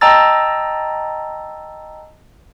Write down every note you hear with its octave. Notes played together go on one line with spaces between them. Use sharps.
D#5 G5 A5 A#5 E6 A6